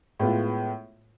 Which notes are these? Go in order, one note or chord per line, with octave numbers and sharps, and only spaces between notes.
A2 G#3 B3 F4